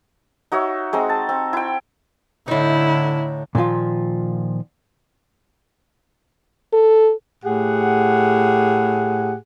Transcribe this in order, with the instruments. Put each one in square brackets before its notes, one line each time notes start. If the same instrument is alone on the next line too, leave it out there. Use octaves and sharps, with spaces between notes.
[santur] D#4 F#4 C#5 E5
G#3 C4 D#4
A5
C4
E4 G5
[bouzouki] A2 D#4 [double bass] D3 [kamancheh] E4
[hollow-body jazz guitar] A#2 D3 D#3 F3 F4
[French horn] A4
[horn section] A2 G4 G#4 F#5